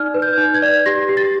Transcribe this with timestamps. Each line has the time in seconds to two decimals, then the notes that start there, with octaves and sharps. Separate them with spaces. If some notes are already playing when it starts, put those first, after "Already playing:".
Already playing: D#4 D5 F6
0.14 B4
0.22 G6
0.38 D#4
0.55 G#6
0.62 D5
0.86 G4 A#6
1.09 G4
1.17 A6